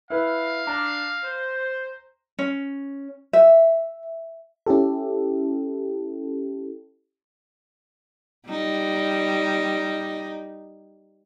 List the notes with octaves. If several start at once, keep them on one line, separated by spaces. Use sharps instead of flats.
E4 B4 F5
D4 A#5
C5
C#4
E5
C#4 E4 G4 A4
G3 D#4